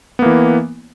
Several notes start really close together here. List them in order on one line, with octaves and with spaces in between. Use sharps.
B3 A#3 E3